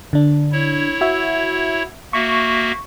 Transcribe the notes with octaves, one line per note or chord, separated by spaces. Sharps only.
D3 D4
E4 C#5
F#4 E5
A#3 F#4 E5 C#6